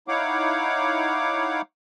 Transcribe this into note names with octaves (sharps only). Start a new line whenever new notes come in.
D#4 E4 C#5 F5 F#5 D6